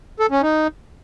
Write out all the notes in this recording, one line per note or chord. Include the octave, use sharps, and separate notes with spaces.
A4
C#4
D#4